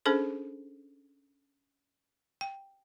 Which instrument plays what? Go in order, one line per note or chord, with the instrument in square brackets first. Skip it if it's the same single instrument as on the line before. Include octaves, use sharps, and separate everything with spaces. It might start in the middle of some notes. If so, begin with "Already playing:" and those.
[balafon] C#4 D4 G#4 A4 C5
G5